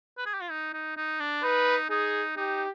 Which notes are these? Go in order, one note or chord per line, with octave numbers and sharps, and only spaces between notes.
B4
G#4
G4
F4
D#4
D#4
D#4
D4
D#4 B4
D#4 G#4
D#4 G4